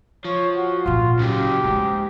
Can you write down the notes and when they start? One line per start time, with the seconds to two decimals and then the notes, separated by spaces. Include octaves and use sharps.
0.25 F3 C#5
0.56 F#4
0.86 G#1 A#2 F4
1.19 C#3 F#3 G4
1.64 G#2 A#3 D4